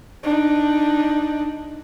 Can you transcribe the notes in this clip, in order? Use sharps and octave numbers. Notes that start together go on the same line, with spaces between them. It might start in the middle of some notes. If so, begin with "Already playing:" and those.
D4 D#4